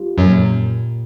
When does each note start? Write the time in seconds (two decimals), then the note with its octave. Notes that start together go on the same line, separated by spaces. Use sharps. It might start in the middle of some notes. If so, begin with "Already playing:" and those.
Already playing: G3 F4
0.18 F#2 A#2 F#3